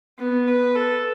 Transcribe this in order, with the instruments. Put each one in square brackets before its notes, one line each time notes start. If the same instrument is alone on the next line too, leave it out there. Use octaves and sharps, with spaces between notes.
[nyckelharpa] B3
B4
A4